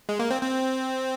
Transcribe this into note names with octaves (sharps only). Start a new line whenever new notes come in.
G#3
A#3
C4
C4